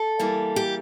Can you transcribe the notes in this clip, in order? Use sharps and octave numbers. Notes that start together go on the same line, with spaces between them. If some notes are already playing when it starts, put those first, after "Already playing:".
Already playing: A4
E3 G3 A#3
G4